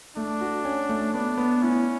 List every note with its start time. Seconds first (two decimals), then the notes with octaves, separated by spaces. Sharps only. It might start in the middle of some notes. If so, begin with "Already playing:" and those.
0.16 A3 D4
0.41 F#4
0.65 C#4
0.89 A3
1.14 B3 D4
1.38 B3
1.62 C#4 E4